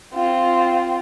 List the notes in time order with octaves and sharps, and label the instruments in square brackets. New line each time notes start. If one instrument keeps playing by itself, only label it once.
[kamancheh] C4 F4